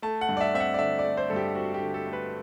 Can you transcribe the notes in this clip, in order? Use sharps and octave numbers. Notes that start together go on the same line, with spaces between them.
A3 A5
F#5
G2
D5
E5
C4 E5
F#5
D5
D3 E5
D5
A3
C5
G2 A4
G4
C4 F#4
G4
D3
A4
A3
B4